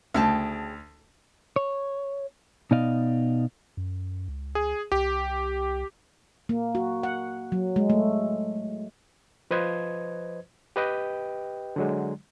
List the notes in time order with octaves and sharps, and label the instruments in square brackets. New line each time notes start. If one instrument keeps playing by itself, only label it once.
[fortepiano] D2 [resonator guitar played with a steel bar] C#3 G5 A5
[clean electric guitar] C#5
B2 B3 D#4 D5 D#5 F5
[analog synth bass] F#2
C#2
[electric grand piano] G#4
[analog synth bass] C2 [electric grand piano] G4
[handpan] A#3
F#4
F#5
F#3
G#3
A3
[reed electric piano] F3 B4 C5 D#5 G#6
G4 B4 D#5 G5
D3 F#3 G#3